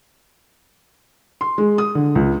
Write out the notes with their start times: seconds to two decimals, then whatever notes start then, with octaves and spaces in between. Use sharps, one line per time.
1.41 C6
1.58 G#3
1.78 D#6
1.95 D3
2.15 C#2